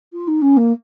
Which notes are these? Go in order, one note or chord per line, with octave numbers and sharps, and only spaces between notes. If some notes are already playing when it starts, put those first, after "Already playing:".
F4
D#4
C#4
A#3